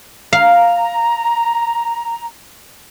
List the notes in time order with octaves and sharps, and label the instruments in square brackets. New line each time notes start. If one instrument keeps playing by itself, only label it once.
[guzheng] F5 [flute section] A#5